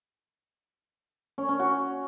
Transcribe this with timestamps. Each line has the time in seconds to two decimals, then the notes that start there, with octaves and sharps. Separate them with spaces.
1.38 C#4
1.49 C#4
1.59 F#4